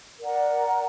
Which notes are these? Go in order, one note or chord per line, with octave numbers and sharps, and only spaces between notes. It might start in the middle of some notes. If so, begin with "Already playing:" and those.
A#4 D5 F#5 A#5